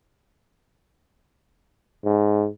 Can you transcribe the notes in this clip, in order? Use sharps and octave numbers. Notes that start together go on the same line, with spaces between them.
G#2